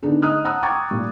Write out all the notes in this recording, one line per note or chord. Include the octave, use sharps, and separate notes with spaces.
D3 B3 D4 D#4 G#4
D#5 A#5 D#6 F6 F#6
F#5 A5 A#5 D#6 E6 F#6
G5 A#5 C#6 D6 G#6 A6
A#2 G3